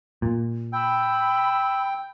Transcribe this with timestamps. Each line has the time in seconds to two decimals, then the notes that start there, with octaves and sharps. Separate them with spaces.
0.22 A#2
0.73 G5 B5 E6